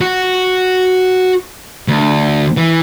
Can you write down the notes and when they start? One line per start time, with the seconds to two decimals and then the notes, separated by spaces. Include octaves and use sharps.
0.01 F#4
1.88 D2
2.57 E3